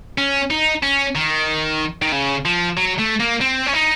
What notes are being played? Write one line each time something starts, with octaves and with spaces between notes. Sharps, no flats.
C#4
D#4
C#4
D#3
D#3
C#3
F3
F#3
A3
A#3
C4
C#4
D#4